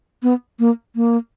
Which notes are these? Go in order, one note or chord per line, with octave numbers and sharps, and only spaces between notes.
B3
A#3
A#3